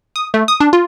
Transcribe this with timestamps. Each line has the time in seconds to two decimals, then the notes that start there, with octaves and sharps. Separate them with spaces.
0.16 D#6
0.34 A3
0.48 D#6
0.60 D4
0.73 F4